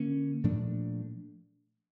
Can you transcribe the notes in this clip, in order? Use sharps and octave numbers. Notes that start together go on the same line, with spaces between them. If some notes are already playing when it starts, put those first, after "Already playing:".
Already playing: D3 A#3 C#4
A#2 F3 A3 D4